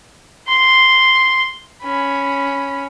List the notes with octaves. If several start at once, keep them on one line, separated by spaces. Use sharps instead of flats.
C6
C#4 B5